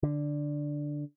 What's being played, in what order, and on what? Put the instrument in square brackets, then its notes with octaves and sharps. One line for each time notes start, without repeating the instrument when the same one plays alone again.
[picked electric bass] D3